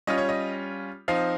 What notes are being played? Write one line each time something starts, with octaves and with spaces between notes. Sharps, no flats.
G3 C#4 F4 D#5
C#5
D#5
F3 C4 D#4 F5